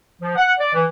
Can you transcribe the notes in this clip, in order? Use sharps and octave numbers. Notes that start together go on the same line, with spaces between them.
F3
F#5
D5
E3